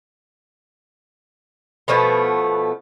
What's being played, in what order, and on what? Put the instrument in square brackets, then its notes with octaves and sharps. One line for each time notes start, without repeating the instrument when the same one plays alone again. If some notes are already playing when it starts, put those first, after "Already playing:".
[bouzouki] B2 F3 A3 B3